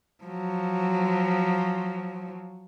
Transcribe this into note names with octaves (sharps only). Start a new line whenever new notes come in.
F3 F#3